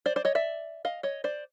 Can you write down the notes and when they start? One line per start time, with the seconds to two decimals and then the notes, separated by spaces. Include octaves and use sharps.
0.06 C5 D5
0.16 C5 D5
0.25 C#5 D#5
0.35 D5 E5
0.85 D#5 F5
1.03 C#5 D#5
1.24 C5 D5